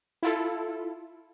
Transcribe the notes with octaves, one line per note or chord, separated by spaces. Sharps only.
E4 F4 A4